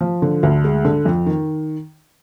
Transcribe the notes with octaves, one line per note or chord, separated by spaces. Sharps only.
F3
D3
D2
G#3
D3
F2
D#3